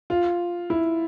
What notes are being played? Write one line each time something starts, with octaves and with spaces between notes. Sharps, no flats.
F4
E4